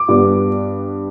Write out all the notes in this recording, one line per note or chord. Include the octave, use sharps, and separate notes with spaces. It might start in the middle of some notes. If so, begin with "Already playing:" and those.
Already playing: D6
G2 G3 B3 D4